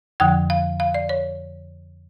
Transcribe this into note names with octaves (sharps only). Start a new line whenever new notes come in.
F2 D3 F3 G5
F5
F5
D5
C#5